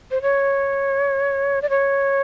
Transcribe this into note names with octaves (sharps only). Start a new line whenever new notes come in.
C5
C#5
D5
C#5